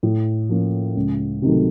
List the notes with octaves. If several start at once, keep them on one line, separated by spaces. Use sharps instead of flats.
A2
F3 A#3 C#4
C#2
C3 D#3 F#3 A3